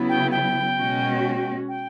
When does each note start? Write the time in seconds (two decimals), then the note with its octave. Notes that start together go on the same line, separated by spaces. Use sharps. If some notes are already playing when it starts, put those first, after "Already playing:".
Already playing: C#3 F#3 B3 E4
0.09 G5
0.31 G5
0.77 B2 G#3 C#4 F#4
1.69 G5